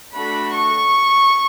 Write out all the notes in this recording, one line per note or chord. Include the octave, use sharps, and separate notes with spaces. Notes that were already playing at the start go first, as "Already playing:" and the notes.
A3 D4 F#4 A4 B5
C#6